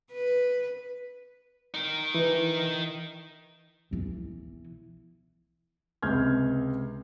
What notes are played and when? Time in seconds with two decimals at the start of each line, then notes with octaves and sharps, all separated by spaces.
0.12 B4
1.74 D#4 A#4
2.15 E3
3.91 B1 E3
6.03 C#2 C3 F6 G6 G#6